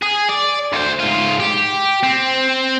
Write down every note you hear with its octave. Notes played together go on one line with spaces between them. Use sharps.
G#4
D5
D2 C5
G#2 F4
G4
C4